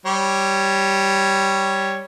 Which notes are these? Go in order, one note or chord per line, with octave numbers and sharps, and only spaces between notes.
G3 C#5